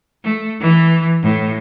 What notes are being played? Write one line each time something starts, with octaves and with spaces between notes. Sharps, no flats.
A3
E3
A2